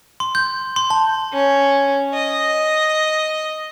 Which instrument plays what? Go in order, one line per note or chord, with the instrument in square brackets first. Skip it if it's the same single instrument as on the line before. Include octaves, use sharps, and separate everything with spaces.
[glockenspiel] C6
G6
C6
A5
[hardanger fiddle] C#4
D#5